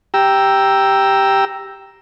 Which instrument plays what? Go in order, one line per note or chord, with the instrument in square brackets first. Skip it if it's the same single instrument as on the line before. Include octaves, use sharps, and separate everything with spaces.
[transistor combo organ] G4 G5 A#5 E6